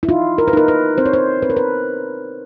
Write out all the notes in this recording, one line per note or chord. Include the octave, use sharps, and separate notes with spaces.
E4
D#4 F4
A#4
B4
D#4 A#4
B4
C4 C5
C#5
C5
C4 B4
A#4
B4